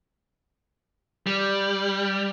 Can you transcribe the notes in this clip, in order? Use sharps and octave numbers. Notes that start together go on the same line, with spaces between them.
G3